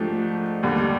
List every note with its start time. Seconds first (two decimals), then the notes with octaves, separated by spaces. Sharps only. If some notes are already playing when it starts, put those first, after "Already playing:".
Already playing: G#2 F3 A3 D4 G4
0.63 D#2 D3 G3